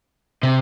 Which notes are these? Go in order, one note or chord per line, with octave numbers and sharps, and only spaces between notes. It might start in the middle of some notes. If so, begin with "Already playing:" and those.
C3